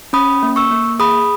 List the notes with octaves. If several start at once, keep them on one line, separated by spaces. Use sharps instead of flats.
C#4 B5 D#6
A#3
C#6 E6
A#3
G#4 B5 D#6